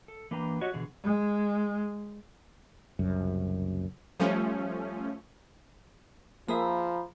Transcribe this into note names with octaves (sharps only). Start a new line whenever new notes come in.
A4
E3 A#3 D4 B4 G5 A#5
F#4 G4 C#5 D#5
B2 D3 E3 G#4
G#3
F#1 C2 F#2
F3 G3 A3 C#4
F3 A#3 G#4 E5 A#5 B5